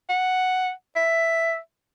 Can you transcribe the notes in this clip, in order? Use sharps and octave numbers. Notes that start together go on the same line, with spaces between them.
F#5
E5